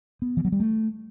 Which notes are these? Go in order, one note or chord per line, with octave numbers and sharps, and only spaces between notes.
B3
E3
F#3
G3
A3